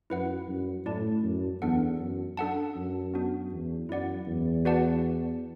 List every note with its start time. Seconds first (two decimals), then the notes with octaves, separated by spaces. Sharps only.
0.10 F#2 E4 B4 F#5
0.48 F#2
0.85 A2 E4 D5 A5
1.23 F#2
1.61 E2 B3 D4 A4 F#5
1.99 F#2
2.37 D4 A4 F#5 A5
2.76 F#2
3.14 B3 D4 F#4
3.52 E2
3.89 F#2 E4 D5 F#5
4.27 E2
4.65 F#4 B4 D5 F#5 A5